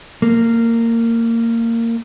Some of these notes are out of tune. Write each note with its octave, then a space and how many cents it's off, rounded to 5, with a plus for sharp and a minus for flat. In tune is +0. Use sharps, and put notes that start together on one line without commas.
A#3 -20